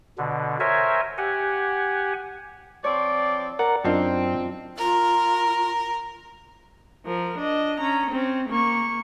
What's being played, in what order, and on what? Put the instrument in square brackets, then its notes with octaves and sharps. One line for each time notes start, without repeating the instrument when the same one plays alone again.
[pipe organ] B2 D3
A#4 C5 C#5 E5 G#5
G4 F#5 G#5
[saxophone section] F3 C4 D5 [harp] C#5
[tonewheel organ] A#4 F#5 [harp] D5
[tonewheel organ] F#2 [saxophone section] C4 [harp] D4 D#4 F4
[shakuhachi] F4 [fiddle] A#4
[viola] F3 A#4
D4 D#5
C#4 A#5
C4 C#4
A#3 C#6